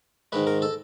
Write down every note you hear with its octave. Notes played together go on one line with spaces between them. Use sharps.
G#2 D#3 G#3 B4
A#4
A4